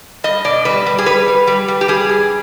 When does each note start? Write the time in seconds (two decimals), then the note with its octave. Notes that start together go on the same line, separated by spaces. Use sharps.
0.24 G3 D#5
0.44 B2 D5
0.65 G3 B4
0.86 G3
0.98 G#4
1.06 G3 B4
1.28 G3
1.47 G3
1.68 G3
1.81 G4
1.88 G3 G#4
2.09 G2